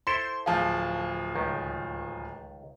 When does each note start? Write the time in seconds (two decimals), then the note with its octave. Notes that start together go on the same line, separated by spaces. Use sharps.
0.07 E4 A4 C5 C6
0.46 D1 F3 G#4 F5 A5
1.35 C#2 D#3